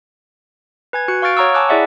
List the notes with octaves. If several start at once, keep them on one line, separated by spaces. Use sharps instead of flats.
B4 G#5 G#6
F#4 F#6 C#7
F5 C#6 F6 A6 D7
C#5 F#5 A#5 C#6 D#6 E6
G#5 A5 D6 E6 F#6
E4 G#4 D5 E5 F#5